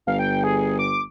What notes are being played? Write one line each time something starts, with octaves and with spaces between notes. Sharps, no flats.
G1 F5
G5
G#4
D6